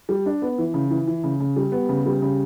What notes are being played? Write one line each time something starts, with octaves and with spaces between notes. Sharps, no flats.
G3
D4
B3
E3
C#3
E3
E3
C#3
C#3
G3
B3
C#3
G3
C#3